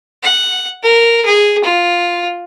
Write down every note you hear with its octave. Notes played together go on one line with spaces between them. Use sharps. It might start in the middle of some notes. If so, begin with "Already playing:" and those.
F#5
A#4
G#4
F4